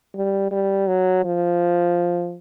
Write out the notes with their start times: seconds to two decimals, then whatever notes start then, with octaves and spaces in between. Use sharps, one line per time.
0.15 G3
0.52 G3
0.87 F#3
1.24 F3